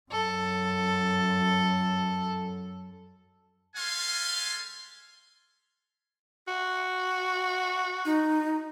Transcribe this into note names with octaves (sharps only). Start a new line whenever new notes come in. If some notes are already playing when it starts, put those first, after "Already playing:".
F#2 A4
G3 G#3 A4 F5 G#5 C6
F#4
D#4